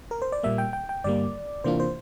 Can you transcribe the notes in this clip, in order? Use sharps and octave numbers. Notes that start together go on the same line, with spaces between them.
A#4
C5
D5
A#2 G3 A#3 E5
G5
G5
G5
G2 D3 G3 A#3 D5
C3 E3 A#3 D4 F4 C5
C5